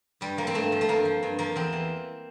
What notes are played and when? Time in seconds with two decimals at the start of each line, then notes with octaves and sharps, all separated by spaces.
0.21 G2 G3
0.38 F3 A#3
0.47 C4
0.54 G2 A3
0.72 F3
0.81 A3
0.89 G2 A#3
1.05 F3
1.23 G2
1.39 F3 A#3
1.56 E2 C4
1.73 E3